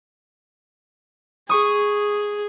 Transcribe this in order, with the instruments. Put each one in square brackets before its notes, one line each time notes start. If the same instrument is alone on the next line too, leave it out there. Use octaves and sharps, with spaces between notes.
[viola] G#4 [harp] C#6 D#6